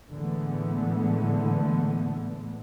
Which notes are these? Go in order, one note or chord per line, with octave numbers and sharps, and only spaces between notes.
A2 D3 E3 G#3 A3 B3